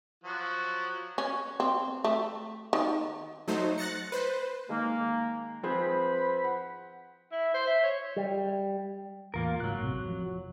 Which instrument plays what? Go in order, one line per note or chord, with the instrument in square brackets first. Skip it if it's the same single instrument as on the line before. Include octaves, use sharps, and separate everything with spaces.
[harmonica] F3 F#3 F#4
[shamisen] C#4
C4
A3
D#3
[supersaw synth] F#3 A3 D#4 C5
F#6 A6 A#6 C#7
B4 C5
[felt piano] D#3 G#3 [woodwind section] A#3
[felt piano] F3 C4 G#4 [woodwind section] B4 C5 B5
[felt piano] F#5
[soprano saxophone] E4
C5
E5
C#5
[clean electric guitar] G3
[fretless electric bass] E2 A2 E3 [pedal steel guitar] A#3 F4 A#4
[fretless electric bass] F#1 G#2 [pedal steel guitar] F#3 F#6
[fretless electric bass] A1 C3
F1 F3